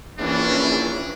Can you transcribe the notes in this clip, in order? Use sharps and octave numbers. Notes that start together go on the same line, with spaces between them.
A#1 E3 C#4 D4 G#4